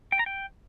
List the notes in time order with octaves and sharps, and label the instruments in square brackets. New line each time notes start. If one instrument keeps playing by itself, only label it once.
[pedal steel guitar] G5
A#5
G5